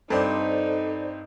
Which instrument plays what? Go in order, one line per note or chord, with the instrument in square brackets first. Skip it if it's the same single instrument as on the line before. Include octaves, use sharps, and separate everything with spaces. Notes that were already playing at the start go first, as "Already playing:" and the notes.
[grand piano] G2 C4 [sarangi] D#4 [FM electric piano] A4 C5 D5